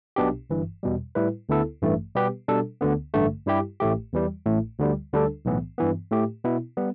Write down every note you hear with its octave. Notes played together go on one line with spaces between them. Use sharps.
B1 B2 B3 D4 G4
G1 G2 E3
E2 B2 G3
A2 G3 E4 B4
D2 D3 B3 E4 A4
A1 G2 E3 A3
B2 G3 B3 G4 B4
B2 G3 D4 A4
D2 D3 B3
A1 G2 D3 A3
G2 G3 E4 G4
A1 A2 A3 G4
E2 E3 G3
A1 A2 A3
D2 D3 G3
D2 D3 G3 D4 A4
B1 A2 E3 B3
G2 E3 B3
A2 A3 G4
B2 B3 E4
G3 B3